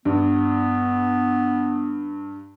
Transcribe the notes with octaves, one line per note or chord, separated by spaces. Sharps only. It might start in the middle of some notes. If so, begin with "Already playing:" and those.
G2 B3